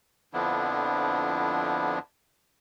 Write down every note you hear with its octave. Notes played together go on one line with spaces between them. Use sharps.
F2 D3 F3 B3 D4 E4